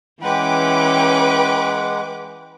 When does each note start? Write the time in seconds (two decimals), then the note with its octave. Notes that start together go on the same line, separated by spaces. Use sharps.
0.23 E3 G#3 C#4 B4 F#5 G5 D6